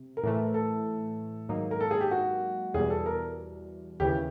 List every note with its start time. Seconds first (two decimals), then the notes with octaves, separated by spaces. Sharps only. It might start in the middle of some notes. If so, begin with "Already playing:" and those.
Already playing: C3
0.17 A#4
0.23 A2 E3 A3
0.54 A4
1.49 G#2 D#3 F#3 A#3 D#4
1.71 A#4
1.80 A4
1.91 G#4
2.01 G4
2.11 F#4
2.74 E2 B2 G3 G#4
2.90 A4
3.06 A#4
4.00 D#2 C#3 E3 G4